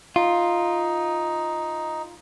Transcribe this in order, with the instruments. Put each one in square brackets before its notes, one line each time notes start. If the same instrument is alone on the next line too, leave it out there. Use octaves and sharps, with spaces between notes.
[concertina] D#4 [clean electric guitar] F4